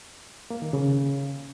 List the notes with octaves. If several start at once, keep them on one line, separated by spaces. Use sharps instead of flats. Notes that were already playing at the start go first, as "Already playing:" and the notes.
A#3
D#3
C#3